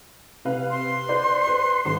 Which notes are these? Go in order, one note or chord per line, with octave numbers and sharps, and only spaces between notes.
C3 B4 F5
C6
B4 C5 D5
B4
G#1 C6